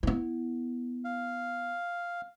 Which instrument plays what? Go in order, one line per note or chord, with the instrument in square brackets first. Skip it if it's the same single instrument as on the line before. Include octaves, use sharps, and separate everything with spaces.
[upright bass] B3 E4
[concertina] F5